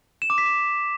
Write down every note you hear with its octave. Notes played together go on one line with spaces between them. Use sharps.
E7
D6
B6
E7